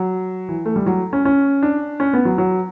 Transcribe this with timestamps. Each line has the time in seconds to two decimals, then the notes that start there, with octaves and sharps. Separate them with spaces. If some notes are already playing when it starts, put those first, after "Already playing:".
Already playing: F#3
0.49 E3
0.65 A3
0.76 G3
0.86 F#3
1.13 C#4
1.25 C#4
1.63 D4
2.00 C#4
2.13 B3
2.25 F#3
2.38 F#3